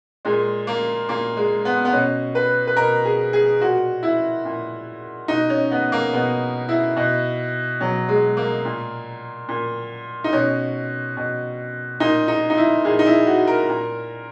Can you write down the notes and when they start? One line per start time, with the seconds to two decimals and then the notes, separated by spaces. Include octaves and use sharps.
0.25 A#2 G#3
0.67 A#3
1.09 A#2 A#3
1.37 G#3
1.65 B3
1.85 B3
1.92 B2 C#4
2.35 B4
2.67 B4
2.77 B2 A#4
3.05 G#4
3.33 G#4
3.61 A#2 F#4
4.03 E4
4.45 A#2
5.28 B2 D#4
5.50 C#4
5.71 B3
5.92 A#3
6.13 B2 B3
6.69 E4
6.97 B2
7.81 B2 F#3
8.08 G#3
8.37 A#3
8.65 A#2
9.49 A#2
10.24 D#4
10.33 B2 C#4
11.17 B2
12.00 A#2 D#4
12.28 D#4
12.50 D#4
12.57 E4
12.85 A#2 G#4
12.99 D#4
13.06 E4
13.27 F#4
13.47 A#4
13.69 A#2